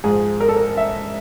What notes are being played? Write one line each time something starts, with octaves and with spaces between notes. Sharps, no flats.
G#2 F3 G#4
A#4
A4
A#4
E5